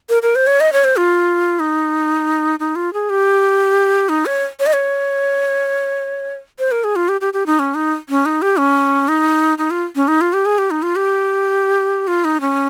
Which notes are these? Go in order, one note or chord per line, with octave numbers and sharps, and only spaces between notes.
A#4
A#4
C5
C#5
D#5
C#5
C5
F4
D#4
D#4
F4
G#4
G4
D#4
C#5
C#5
D#5
C#5
C5
A#4
G#4
F4
G4
G4
G4
D#4
C#4
D#4
C#4
D#4
G4
C#4
D#4
D#4
F4
C#4
D#4
F4
G4
G#4
G4
D#4
F4
G4
F4
D#4
C#4